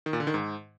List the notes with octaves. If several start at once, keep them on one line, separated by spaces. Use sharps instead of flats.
D#3
A#2
D3
D#3
G#2